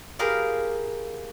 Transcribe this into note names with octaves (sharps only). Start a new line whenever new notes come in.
F4 G4 G#4 A#4 B4